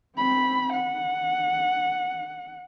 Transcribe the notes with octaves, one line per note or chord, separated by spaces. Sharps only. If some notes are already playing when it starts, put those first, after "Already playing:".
C4 B5
F#5